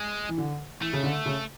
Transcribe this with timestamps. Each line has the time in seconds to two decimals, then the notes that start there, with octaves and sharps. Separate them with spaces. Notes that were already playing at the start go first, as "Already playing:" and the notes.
Already playing: G#3
0.29 E3
0.38 D3
0.81 E3 A3
0.93 C#3
1.03 D3
1.26 C#3